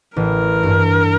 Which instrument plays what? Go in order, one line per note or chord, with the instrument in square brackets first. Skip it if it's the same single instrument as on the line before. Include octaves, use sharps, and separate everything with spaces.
[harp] A1 [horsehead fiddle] A#4
[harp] G2